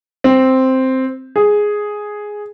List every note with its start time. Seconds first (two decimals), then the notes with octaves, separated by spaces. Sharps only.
0.24 C4
1.36 G#4